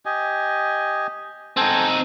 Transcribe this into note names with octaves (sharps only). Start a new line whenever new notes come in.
G4 D#5 G#5
C4 D#4 A4 G5 G#5